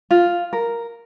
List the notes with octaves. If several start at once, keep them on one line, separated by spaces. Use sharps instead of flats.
F4
A#4